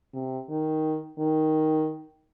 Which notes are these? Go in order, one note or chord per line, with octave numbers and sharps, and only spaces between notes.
C3
D#3
D#3